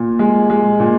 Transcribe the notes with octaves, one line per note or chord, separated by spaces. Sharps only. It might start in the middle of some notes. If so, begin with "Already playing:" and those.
Already playing: A#2
G#3
G#3
A#2